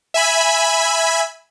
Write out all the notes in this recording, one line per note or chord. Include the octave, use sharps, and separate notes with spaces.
E5 G#5 B5